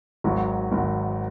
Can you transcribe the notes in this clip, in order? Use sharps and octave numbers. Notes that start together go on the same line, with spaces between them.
G#1 G#2 D#3 F#3
G#1 G#2 D#3 F#3